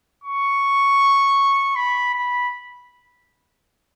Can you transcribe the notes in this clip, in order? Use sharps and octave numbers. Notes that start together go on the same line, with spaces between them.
C#6
B5
B5